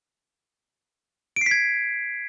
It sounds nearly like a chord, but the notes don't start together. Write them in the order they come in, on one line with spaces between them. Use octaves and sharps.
D7 C7 B6 G#6